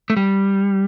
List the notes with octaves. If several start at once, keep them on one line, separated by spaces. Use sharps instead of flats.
A3
G3